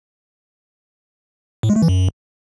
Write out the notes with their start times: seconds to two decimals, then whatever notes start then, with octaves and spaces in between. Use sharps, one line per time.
1.63 A2
1.70 G#3
1.76 A3
1.82 E3
1.89 F#2